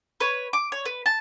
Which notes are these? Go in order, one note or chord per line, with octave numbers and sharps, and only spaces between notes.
B4 C#5
D6
C#5
B4
A5